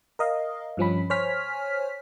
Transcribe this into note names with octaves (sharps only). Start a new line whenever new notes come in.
A#4 D#5 F5
G2 F3 C#4 B5
C5 C#5 G#5 F6 B6